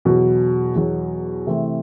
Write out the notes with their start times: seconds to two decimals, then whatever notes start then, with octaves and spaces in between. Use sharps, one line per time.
0.05 E2 B2 F#3
0.76 E2 B2 F#3
1.47 C3 E3 A3 C4